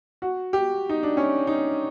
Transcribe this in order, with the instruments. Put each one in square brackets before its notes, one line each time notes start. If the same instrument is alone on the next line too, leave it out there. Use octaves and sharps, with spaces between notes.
[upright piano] F#4
G4
D#4
D4
C#4
D#4